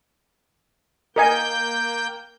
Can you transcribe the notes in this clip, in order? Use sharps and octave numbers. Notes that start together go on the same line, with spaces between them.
A#3 A#4 D#5 G5 G#5 G6